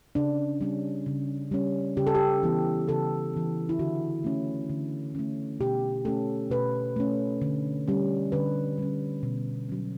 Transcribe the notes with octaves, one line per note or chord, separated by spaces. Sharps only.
C#3 D4
G3 C#4
C#3
G3 C#4
C#3 G4
A4
G4
E3 B3
C#3 A4
E3 B3
E4
D3 F#4
A3 C#4
D3
A3 C#4
B2 G4
A3 C#4 A4
B2 B4
A3 C#4
D3
G3 C#4
D3 B4
G3 C#4
B2
F#3 C#4